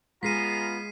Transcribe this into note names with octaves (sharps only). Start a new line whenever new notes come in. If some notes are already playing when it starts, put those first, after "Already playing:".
G#3 B3 F4 G#4 A#5 B6 C7 D#7